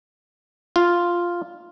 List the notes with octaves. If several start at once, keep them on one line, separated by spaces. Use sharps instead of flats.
F4